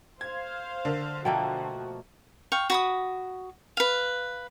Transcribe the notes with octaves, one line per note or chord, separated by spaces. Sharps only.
C5 F5 G#6
D3 A#4 D5
B2 F3 A3 A#3 F#4 G5 A5
F5 G5 C#6
F#4 B5 D#6
B4 F5